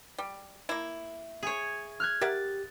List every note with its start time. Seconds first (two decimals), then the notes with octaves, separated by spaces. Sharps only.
0.18 G3
0.69 A#3 E4
1.43 G#4 C#5
2.00 F6 F#6 G#6
2.21 G4 A#4 E5 F#5 A6